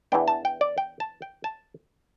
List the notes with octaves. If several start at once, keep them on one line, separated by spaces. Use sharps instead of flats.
E2 E3 B3 D4 G5
A5
G5
D5
G5
A5
G5
A5